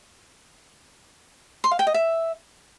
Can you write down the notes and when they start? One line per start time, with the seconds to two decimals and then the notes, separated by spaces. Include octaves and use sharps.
1.64 C6
1.71 F5
1.79 G5
1.87 D#5
1.94 E5